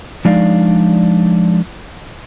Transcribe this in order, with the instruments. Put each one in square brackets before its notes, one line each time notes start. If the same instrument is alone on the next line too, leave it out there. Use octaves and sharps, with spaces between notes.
[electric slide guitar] F3 G#3 D4 D#4 D5 F5